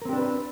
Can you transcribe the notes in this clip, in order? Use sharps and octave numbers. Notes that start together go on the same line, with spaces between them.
C4 D4 G4 A#4 B4